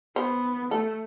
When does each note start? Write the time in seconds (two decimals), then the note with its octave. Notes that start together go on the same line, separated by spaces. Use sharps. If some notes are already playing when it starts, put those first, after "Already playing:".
0.16 B3 C5
0.71 A3 A4